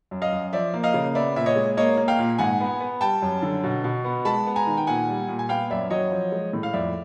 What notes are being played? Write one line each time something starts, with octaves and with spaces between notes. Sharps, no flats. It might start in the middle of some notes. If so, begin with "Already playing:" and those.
F#2
D#5 F5
F#2
F3 D5 E5
A#3
D#5 F5
C#3
B3 D5 E5
A#2 E5
C#5 D#5
G#3
A#3 C#5 D#5
A#3
F5 G5
A#2
G#2 F#5 G#5
B3
B3
G3 G5 A5
F#2
D3
B2
B2
B3
G#3 A5 B5
B3
G#5 A#5
D#3
G5
A#2 F#5 G#5
G3
A#2
G#5
B3 F5 G5
F#2 D5 E5
F#3 C#5 D#5
F3
G#3
A2
F5
F2 D5 E5